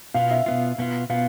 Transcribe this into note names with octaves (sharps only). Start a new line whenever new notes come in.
B2 B3 F4 F5
E5
B2 B3 F4
B2 B3 F4
B2 B3 F4 F5